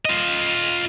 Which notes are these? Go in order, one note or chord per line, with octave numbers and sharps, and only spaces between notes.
F4 D#5